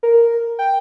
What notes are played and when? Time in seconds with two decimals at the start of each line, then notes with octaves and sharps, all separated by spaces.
0.03 A#4
0.59 G5